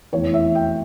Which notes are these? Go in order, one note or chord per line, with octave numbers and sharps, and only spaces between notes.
F1 E2 E3 C#5
E5
G5